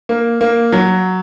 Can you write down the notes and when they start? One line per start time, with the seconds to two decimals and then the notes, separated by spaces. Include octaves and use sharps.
0.09 A#3
0.41 A#3
0.72 F#3